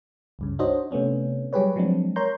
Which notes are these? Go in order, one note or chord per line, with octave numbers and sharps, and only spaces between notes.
C#2 G2 C#3
D4 D#4 F#4 C5 C#5 D#5
C3 A3 B3 C#4 D4
F#3 G3 G4 G#4 B4 C#5
F3 F#3 G#3 C4 D4
A#4 C#5 A#5 C6 G6